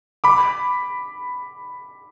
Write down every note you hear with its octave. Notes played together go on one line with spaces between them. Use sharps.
B5 D6